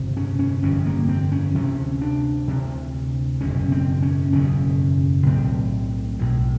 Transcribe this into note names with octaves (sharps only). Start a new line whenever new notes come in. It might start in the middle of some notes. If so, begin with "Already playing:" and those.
Already playing: G1 F2 C3
C#4
C#4
G1 F2 C3 C#4
A#3
C4
C#4
D2 C3 C#4
D4
D2 C3
F#1 E2 B2 C#4
C4
C#4
F#1 E2 B2 C#4
B1 A2 C4
B1 A2